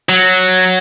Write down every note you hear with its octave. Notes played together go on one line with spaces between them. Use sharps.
F#3